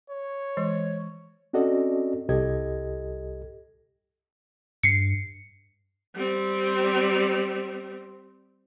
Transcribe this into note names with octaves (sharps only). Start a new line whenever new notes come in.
C#5
E3 G#3
C4 C#4 F#4 A4 D5 D#5
C2 G4 A4 D#5 G#6
G2 C7 C#7
G3 C4